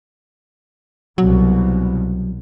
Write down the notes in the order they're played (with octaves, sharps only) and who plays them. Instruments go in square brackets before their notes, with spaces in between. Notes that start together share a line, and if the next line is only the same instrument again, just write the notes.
[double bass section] C2 B2 [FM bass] F#3